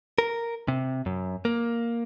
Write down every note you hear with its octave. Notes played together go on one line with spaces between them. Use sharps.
A#4
C3
F#2
A#3